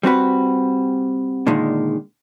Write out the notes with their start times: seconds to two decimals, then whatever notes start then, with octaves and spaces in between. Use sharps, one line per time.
0.03 G3 C4 F#4 B4
1.47 A#2 D3 D#3 G#3